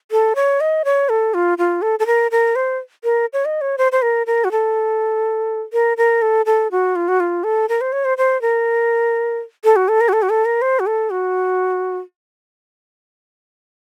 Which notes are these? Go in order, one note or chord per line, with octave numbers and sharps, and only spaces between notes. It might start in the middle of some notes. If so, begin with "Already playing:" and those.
A4
C#5
D#5
C#5
A4
F4
F4
A4
A4
A#4
A#4
C5
A#4
C#5
D#5
C#5
C5
C5
A#4
A#4
F#4
A4
A#4
A#4
A4
A4
F#4
F4
F#4
F4
A4
A#4
C5
C#5
C5
C5
A#4
A4
F#4
A4
A#4
F#4
A4
F#4
A4
A#4
C5
F#4
A4
F#4